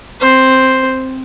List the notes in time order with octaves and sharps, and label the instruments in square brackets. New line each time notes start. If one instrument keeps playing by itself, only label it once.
[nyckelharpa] C4 C5